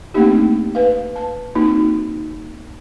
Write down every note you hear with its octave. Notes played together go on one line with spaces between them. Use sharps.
A3 A#3 C4 D4 D#4 G4
B4 F5
A5
A#3 C4 D#4 F#4